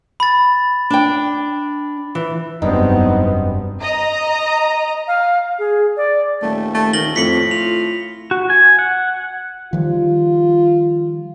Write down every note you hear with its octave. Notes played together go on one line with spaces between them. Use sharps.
B5 A6
D4 G5
E3
F1 G2 F#3 B3 C4 D#4
D#5 A#5
F5
G#4
D5
D#1 A3
A3
D#3 A#6 F#7 G7
F2 A2 B6 C#7 F#7
F4 F7
F#4
G#5
F#5
D#3 F3 G3 F4